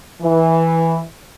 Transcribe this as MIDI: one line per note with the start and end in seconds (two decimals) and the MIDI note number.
0.22 1.01 52